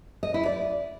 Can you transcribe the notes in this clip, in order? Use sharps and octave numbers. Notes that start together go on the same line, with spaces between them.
D#5
E4
D5